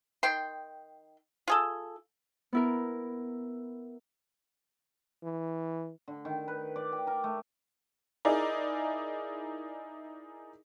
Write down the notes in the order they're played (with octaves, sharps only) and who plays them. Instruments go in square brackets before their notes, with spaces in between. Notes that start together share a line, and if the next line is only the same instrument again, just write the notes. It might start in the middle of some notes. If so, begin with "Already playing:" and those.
[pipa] D#3 G5 C6
F4 G#4 A4
[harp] B3 E4 A#4
[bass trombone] E3
[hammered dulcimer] D3
D#3
B4
D5
G4
A#4
A3
[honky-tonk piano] D#4 E4 G#4 A#4 D5